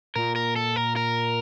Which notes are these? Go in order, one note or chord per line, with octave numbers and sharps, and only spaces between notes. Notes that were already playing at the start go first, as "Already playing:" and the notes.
A#2 A#4
A#4
A4
A#4
A#4